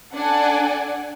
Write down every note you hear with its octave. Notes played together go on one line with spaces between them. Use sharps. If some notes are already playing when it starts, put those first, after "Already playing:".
D4 A4 D5 F#5 G#5